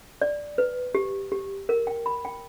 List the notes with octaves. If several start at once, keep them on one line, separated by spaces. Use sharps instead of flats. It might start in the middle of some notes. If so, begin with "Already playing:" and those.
D5
B4
G4
G4
A#4
G5
B5
G5